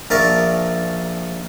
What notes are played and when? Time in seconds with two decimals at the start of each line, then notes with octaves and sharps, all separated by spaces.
0.10 A#1 A#4 D5 E5 A5 C#6